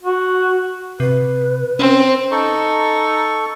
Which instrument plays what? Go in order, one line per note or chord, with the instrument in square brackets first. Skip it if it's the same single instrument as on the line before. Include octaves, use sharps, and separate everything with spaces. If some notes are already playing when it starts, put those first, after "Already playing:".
[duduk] F#4
[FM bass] C3 [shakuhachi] B4
[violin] C4 [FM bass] C#4
[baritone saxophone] D#4 [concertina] A4 C#6